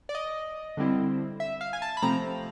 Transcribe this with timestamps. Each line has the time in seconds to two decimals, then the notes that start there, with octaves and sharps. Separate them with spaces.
0.09 D5
0.15 D#5
0.77 D3 G3 C4 E4
1.40 E5
1.61 F5
1.73 G#5
1.82 A5
1.97 B5
2.02 C3 F3 A3 C4 A#5